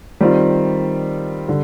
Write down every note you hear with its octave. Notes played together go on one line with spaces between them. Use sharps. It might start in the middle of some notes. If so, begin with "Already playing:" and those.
D#3 G3 C4 F4
D3 G3